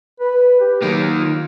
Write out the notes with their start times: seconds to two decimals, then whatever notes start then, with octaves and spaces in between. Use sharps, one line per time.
0.20 B4
0.61 G4
0.82 D#3 F#3 A#3
1.18 F4